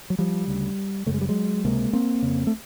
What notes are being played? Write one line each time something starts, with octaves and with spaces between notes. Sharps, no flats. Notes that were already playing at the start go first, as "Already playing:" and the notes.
F#3
F3 G3
D2 C#3
F#2 C#3 A3
G#3
G3
F#3 G#3
C#2 C3 G#3 A#3
A#3 C4
F2 C#3
A3